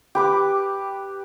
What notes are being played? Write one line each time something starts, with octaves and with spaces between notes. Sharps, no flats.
G4 B4 D6